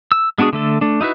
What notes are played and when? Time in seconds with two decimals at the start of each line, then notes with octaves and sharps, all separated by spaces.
0.12 E6
0.38 G#3 B3 D4 F#4 G#4
0.53 D3 A3 A4
0.81 A3 D4
1.01 D#4 E4 F#4 B4